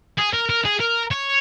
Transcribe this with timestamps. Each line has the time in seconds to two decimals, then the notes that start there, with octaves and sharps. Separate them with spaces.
0.18 G#4
0.33 A#4
0.49 A#4
0.65 G#4
0.80 A#4
1.11 C#5